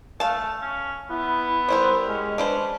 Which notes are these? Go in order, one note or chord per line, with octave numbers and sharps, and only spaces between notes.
A3 F5 A5
C#4
B3 E4
G3 E4 A#4 C5
G#3 C#4
D4 B4 C5